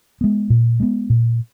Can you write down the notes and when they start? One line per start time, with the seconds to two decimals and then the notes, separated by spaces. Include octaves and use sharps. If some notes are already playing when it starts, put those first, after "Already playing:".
0.21 G#3 B3
0.50 A#2
0.80 G#3 B3
1.10 A#2